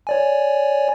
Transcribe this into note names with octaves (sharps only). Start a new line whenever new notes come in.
C#5 D5 G#5